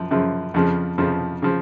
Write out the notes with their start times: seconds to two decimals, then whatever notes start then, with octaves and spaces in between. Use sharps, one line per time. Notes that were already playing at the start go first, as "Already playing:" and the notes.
Already playing: F#2 F3
0.11 F#2 C#3 F3
0.54 F2 C#3 F3
0.98 F2 C#3 F3
1.42 C#3 F3